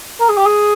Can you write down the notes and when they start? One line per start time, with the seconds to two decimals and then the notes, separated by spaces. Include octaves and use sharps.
0.20 A#4
0.29 G#4
0.37 G4
0.46 G#4